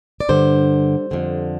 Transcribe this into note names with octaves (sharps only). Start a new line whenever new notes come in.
D5
G2 D3 C5
F2 D3